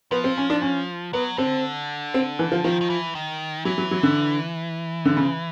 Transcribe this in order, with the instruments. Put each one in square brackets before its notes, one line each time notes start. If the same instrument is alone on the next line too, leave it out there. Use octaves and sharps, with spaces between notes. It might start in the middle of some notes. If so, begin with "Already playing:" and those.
[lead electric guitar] F3 [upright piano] B3
[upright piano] C4
C#4
D4
C#4
[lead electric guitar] F#3 [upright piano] B3
[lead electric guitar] D3 [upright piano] C4
[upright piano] C4
E3
F3
[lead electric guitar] D#3 [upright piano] F3
[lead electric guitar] D#3
E3
D#3
[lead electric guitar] E3 [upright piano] F#3
[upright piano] F#3
F#3
D3
D3
C#3